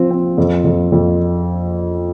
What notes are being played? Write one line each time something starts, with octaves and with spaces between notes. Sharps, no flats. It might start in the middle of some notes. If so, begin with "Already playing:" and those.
Already playing: F3 C4
C4
F2
F2
F2